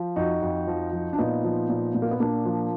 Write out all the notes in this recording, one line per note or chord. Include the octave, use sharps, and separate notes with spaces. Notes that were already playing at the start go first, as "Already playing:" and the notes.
Already playing: F3
F2 D#4 F#4
F2
F3
F3
D4
A#2 B3 D#4
F3
A#2
A#2
A#3
B3
A#2 A#3 D4
F3